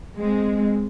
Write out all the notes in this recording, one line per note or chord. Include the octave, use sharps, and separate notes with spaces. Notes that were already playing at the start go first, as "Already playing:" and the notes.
G#3 C4